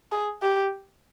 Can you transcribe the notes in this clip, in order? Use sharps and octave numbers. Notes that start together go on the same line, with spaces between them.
G#4
G4